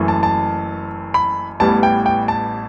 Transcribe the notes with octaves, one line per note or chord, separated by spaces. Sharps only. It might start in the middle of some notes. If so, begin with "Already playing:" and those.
Already playing: F#1 F#2 E3 A3
A5
A5
B5
A1 A2 G3 B3 A5
G5
G5
A5